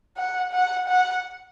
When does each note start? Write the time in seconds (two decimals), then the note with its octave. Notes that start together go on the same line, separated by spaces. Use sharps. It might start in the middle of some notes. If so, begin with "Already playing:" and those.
0.17 F#5
0.52 F#5
0.88 F#5